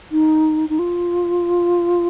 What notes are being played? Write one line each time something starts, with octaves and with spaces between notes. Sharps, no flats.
D#4
D#4
F4